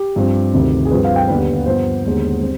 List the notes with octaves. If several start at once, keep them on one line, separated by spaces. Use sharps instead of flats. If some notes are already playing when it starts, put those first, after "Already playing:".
Already playing: G4
G2 F3 C4
D2 C3 D#3
G#4
G2 F3 C4 B4
F5
G5
D#2 D3 G3 B3 B4
G2 F3 B3 C5
D#2 D3 G#3 B3
G3 C4